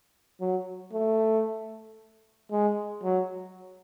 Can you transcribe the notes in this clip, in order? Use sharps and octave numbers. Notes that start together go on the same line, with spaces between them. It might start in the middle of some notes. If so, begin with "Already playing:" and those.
F#3
A3
G#3
F#3